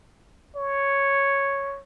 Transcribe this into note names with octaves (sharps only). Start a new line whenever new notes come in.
C#5